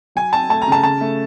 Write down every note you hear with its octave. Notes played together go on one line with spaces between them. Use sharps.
F#3 G#5
C4 A5
A3 A5
A#5
C#3 A5
C#3 A5
A3